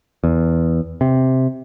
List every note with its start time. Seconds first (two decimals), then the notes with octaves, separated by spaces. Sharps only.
0.24 E2
1.01 C3